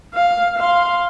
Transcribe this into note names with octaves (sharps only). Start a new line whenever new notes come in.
F5
F5 C6